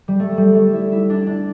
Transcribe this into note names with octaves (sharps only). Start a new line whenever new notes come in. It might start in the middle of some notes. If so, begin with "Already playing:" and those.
G3
A3
G3
A3
E4
E4
D4
D4